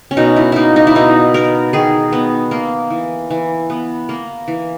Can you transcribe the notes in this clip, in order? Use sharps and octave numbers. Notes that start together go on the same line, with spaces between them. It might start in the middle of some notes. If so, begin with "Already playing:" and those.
C#4
B2 D#4
E4
A#3 D#4 E4
D#4
E4
B2 D#4
B3 A#4
D#3 G#4
B3
A#3
E3
E3
B3
A#3
E3